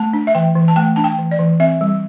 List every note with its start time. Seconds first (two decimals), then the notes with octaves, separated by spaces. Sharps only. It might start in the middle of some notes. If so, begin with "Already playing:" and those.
Already playing: A3 A5
0.13 D4
0.27 E5
0.35 E3 G5
0.56 E3
0.68 A5
0.76 A3 G5
0.96 D4 A5
1.04 G5
1.18 E3
1.31 D5
1.39 E3
1.60 C4 E5
1.81 G3